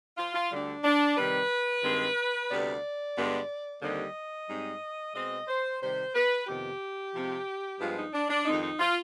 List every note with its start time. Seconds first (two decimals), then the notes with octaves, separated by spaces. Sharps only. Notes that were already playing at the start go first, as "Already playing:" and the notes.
0.17 F4
0.35 F4
0.51 D2 D3 G3 D4
0.84 D4
1.17 C3 D#3 G3 C4 B4
1.83 G2 D#3 G#3 C4
2.50 D2 C3 G3 B3 D5
3.16 G2 D3 G#3 B3
3.82 D#2 D3 G3 C4 D#5
4.48 G#2 G3 C4
5.14 B2 G#3 C4 D#5
5.47 C5
5.81 C3 D#3 G3 C5
6.15 B4
6.47 F2 C3 D#3 B3 G4
7.14 C3 F3 G#3 C4
7.80 G2 F3 G#3 B3 F4
7.97 D#4
8.13 D4
8.29 D4
8.45 F2 D#3 G#3 C4 D#4
8.62 D#4
8.79 F4